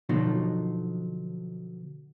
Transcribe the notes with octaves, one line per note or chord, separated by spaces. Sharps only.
B2 D3 F3 F#3 D#4